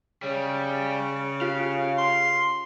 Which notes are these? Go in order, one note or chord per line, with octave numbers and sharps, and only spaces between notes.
C#3 G3
F4 G4 F5
C6